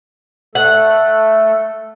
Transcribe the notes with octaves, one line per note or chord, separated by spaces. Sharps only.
A3 A4 F#5